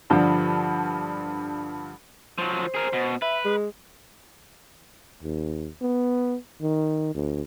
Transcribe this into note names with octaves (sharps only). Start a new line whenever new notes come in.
G2 D3 F3
F3 F#3 C5
G#4 A#4
B2
B4 E5
G#3
D#2
B3
D#3
D2